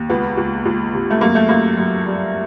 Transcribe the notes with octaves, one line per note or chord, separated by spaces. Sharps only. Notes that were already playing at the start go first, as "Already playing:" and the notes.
Already playing: D#2
C#2 B3
C#2
C#2
C3
A3
F#2 A#3
A3
F#2 A#3
F#2
G3